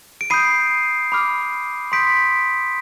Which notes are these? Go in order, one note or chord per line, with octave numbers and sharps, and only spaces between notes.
D7
B5 D#6 G6 C7 D#7
B5 D6 F6
C6 D#6 G6 B6 D7